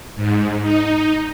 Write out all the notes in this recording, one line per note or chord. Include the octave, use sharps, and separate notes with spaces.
G#2
D#4